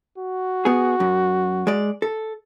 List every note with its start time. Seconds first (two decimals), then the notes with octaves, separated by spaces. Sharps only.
0.18 F#4
0.65 B3 G#4
1.00 F#2
1.67 G#3 D5
2.02 A4